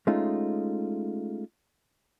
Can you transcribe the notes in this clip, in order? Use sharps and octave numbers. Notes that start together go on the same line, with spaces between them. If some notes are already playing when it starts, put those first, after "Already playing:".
G#3 A3 C#4 D#4 F4